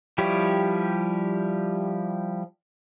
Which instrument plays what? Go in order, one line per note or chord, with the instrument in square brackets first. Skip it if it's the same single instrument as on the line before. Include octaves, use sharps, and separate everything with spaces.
[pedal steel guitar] F3 G3 E4 G4 C#5